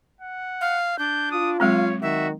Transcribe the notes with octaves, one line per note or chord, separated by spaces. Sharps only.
F#5
F5
D4 G6
F4 D#6
F#3 G#3 C4 C#5 F5
D#3 F#4 E5